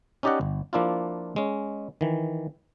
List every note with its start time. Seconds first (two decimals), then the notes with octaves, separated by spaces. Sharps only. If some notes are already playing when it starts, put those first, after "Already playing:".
0.23 C#4 D#4 G4 D5 D#5 F#5
0.41 G1
0.73 F3 A#3 D4 E4 F4
1.36 G#3 C#4
2.01 D#3 E3